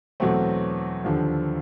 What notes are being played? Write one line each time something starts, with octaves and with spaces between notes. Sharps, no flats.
E2 B2 F#3 A3 C4
D#2 D3 F3